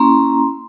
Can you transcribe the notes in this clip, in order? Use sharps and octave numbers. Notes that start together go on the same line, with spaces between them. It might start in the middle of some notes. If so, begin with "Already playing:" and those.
Already playing: A#3 C#4 E4 A#5 C6